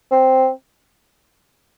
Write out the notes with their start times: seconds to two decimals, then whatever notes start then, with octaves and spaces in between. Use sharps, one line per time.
0.11 C4